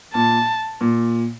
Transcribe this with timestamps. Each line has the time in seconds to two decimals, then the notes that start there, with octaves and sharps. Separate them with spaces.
0.14 A#2 A5
0.81 A#2